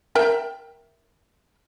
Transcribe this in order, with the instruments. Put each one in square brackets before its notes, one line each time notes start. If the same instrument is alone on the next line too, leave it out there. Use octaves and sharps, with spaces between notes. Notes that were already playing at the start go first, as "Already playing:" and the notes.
[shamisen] A#4 E5 G5